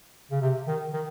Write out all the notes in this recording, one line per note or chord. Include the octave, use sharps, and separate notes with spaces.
C#3
C3
D#3
D#3